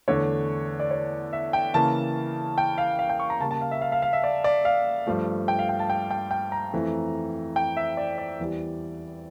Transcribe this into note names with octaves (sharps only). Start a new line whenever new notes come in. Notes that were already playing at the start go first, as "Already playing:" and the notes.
E2 D3 A3 C#5
D5
C#5
E5
G5
C#3 E3 A#3 A5
G5
F5
F5
G5
C#6
A#5
C#3 G3 A#3 A5
A5
F5
E5
F5
F5
F5
E5
D5
D5
F5
G2 F3 A3
G5
F5
G5
A5
G5
G5
G5
A#5
F2 E3 A3
G5
E5
D5
D5
E2 E3 G3